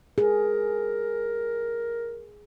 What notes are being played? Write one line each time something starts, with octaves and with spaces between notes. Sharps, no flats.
G#4 A#4